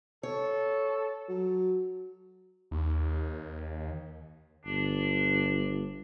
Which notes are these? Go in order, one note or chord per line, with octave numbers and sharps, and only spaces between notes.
A4 C#5
F#3
D#2
G1 D4